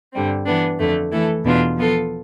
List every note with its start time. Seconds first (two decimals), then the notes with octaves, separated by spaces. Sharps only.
0.13 G2 D3 G3 C4
0.46 E3 B3 D4
0.78 F2 D3 A3
1.11 E3 A3 E4 A4
1.44 E2 B2 B3 D4 F4
1.76 F3 B3 F4 A4